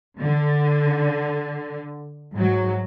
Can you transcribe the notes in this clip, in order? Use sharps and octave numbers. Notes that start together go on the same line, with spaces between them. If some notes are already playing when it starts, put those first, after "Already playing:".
D3
G#2 F#3